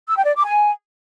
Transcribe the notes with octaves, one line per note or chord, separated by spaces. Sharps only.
E6
G5
D5
D6
G#5